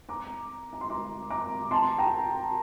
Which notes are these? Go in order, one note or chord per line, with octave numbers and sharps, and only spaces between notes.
A#5 D6
A#5
C6
A#5 D6
A#5 D6
A5 C6
G5 A#5